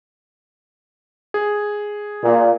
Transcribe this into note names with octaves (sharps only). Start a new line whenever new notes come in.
G#4
A#2